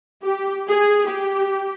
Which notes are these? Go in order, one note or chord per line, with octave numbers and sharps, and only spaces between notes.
G4
G#4
G4